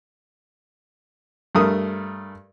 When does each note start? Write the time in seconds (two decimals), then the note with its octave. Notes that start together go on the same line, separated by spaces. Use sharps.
1.55 G2 A3 A#4 D#6